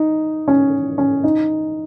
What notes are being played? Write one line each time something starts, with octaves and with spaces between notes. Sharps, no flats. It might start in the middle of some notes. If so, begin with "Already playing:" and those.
Already playing: D#4
C#4
C#4
D#4